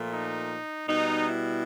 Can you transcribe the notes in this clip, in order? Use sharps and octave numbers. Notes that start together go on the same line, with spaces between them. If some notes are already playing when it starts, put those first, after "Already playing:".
Already playing: A#2 F3 A3
D#4
B2 G3 D#4
E4